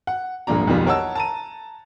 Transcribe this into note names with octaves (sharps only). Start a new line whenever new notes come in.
F#5
D#1 G#1 A#2 F3 D4 A#5
B1 F2 D#3 F3 G3
A#4 C#5 D#5 F#5 A5 E6
A5 A#5 D#7